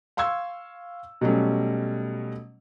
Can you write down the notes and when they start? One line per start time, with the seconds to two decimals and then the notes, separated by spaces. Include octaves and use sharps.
0.17 F5 C6 C#6 E6 G#6
1.21 B2 F#3 G3 A3 C#4